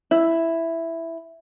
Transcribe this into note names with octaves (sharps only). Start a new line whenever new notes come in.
E4